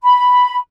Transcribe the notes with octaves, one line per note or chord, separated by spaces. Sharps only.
B5